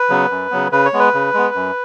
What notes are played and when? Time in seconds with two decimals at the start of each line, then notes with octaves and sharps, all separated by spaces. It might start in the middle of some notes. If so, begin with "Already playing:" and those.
Already playing: B4
0.09 C#3 F#3 B3
0.30 F#2
0.51 C#3 F#3 B3
0.72 C#3 B4
0.85 C#5
0.93 G#3 B3
1.00 B4
1.14 C#3
1.34 G#3 B3
1.55 F#2